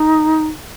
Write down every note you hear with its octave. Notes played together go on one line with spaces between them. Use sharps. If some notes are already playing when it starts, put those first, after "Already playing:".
Already playing: D#4